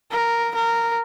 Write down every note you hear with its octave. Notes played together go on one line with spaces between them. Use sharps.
A#4
A#4